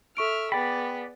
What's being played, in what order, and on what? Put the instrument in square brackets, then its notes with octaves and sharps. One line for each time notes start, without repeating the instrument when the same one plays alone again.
[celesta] A4 C#6 D7 [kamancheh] E5 F6
[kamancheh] B3 G#4 [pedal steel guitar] D5 B5 [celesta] G5